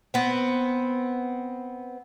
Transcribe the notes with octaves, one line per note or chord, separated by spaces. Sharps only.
B3 C4